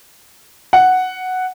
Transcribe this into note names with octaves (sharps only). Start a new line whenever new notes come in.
F#5